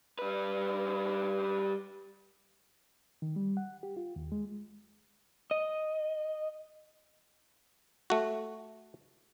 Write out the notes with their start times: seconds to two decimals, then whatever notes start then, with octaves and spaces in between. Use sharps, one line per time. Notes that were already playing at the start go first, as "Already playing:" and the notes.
0.19 G3 B4
3.22 D#3
3.36 G3
3.57 F#5
3.83 G4
3.97 F4
4.16 D#2
4.32 G#3
5.51 D#5
8.10 A3 F#4